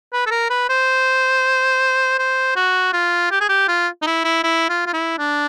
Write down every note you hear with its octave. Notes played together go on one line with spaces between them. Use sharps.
B4
A4
A#4
B4
C5
C5
F#4
F4
G4
G#4
G4
F4
D#4
E4
E4
E4
F4
F4
E4
D4